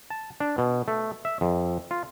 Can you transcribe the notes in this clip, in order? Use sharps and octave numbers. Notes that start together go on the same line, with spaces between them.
A5
D4
B2
A3
E5
F2
F4